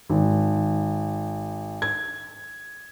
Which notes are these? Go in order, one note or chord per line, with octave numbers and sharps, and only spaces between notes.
G#1
G#6